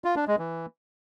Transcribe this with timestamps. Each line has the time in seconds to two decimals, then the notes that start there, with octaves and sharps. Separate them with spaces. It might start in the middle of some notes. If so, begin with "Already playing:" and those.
0.04 F4
0.16 D4
0.27 G#3
0.39 E3